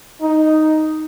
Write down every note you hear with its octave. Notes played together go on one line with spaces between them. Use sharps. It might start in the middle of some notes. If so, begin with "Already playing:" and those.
D#4